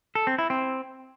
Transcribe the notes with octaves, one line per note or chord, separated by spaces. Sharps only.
A4
C4
E4
C4